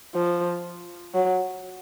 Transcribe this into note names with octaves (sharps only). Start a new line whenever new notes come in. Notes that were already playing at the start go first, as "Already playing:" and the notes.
F3
F#3